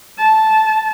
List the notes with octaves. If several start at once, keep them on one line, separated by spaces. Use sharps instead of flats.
A5